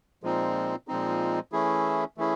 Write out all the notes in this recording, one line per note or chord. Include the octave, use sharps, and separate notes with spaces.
A#2 F3 G#3 C4 D#4
A#2 F3 G#3 C4 D#4
E3 A3 C#4 E4 G#4
E3 A3 C#4 E4 G#4